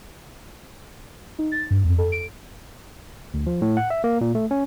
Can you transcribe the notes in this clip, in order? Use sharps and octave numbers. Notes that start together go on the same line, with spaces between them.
D#4
A6
G2
F2
A4
D7
D2
F3
A2
F#5
E5
A#3
A#2
A3
C#4